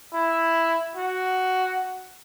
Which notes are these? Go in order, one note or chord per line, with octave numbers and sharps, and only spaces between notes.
E4
F#4